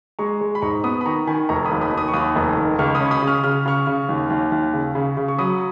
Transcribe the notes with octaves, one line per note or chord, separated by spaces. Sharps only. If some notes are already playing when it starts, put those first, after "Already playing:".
G#3 A#5 C#6
G#3
B5
G#2 A#5 C#6
B3 B5 D#6
B5
D#3 A#5 C#6
D#3 G#5 B5
F1 A#5 C#6
B5 D#6
D#2
B5 D#6
D#3
B5 D#6
C#6
D#2 B5 D#6
F1
D#3
C#2 C#6 F6
B5 D#6
C#4
C#6
B5 D#6
C#3
C#6 F6
C#3 F6
C#3 C#6 F6
C#3
D#2
D#2
D#2
C#3
C#3
C#3
C#6
F#3 B5 D#6